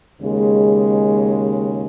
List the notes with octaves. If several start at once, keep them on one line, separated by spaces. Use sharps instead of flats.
D#2 C#3 G#3